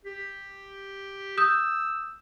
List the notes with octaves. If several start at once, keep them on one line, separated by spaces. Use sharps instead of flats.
G4
D#6 E6 G6